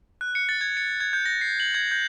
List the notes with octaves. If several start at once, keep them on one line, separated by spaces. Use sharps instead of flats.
F#6
C#7
A6
G#6
C#7
G#6
G6
A#6
C7
F#7
G#6
G6